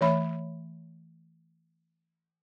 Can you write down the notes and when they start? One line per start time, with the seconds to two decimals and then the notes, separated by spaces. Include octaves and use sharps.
0.01 E3 A3 C#5 E5 B5